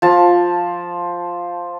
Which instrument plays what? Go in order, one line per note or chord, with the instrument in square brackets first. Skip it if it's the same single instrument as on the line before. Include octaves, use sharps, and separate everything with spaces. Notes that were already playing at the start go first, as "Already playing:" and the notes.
[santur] F3 A5